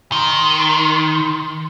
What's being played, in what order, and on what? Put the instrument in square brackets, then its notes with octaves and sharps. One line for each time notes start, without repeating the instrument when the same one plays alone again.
[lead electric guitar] D#3 [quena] C6